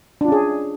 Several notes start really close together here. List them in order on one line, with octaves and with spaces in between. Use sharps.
D4 F4 C#4 G#4